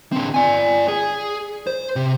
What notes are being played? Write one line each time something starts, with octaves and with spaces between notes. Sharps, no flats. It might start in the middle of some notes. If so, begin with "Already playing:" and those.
D3 C4
D5 G#5
G#4
C5
C3